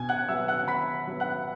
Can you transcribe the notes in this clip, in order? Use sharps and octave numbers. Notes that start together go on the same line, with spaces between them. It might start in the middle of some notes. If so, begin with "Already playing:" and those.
Already playing: B2 G#5 G#6
F#5 F#6
F#3 B3 E5 E6
F#5 F#6
B2 B5 B6
F#3 B3
F#5 F#6